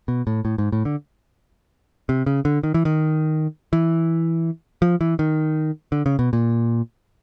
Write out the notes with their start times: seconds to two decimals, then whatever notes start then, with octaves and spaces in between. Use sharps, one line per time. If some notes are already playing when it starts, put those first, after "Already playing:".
0.08 B2
0.27 A2
0.45 A2
0.58 G#2
0.72 A2
0.85 D3
2.09 C3
2.26 C#3
2.45 D3
2.63 D#3
2.74 E3
2.85 D#3
3.73 E3
4.82 F3
5.01 E3
5.19 D#3
5.92 D3
6.06 C#3
6.19 B2
6.33 A#2